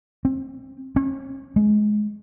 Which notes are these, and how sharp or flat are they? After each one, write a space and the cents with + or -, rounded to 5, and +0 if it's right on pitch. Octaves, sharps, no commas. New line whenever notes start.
C4 +30
C#4 -40
G#3 +20